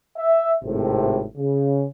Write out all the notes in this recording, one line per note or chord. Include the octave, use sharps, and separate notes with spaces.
E5
G#1 A2 C3
C#3